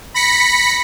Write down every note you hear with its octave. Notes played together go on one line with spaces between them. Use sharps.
B5 A#6 B6 C#7